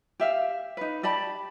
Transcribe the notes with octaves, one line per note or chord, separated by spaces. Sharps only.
G4 E5 F5
D#4 B4
G4 D5 A5 B5